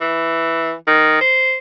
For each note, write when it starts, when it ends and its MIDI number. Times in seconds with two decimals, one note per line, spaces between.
0.01 0.73 52
0.87 1.18 51
1.21 1.57 72